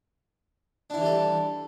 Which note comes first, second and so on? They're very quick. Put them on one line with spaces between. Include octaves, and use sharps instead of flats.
D4 E4 E3 G3 A4